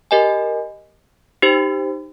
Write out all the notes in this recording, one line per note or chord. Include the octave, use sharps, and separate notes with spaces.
G4 A#4 D#5 G#5
D#4 G4 C5